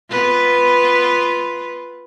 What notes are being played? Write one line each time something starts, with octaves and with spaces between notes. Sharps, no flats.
B3 F4 B4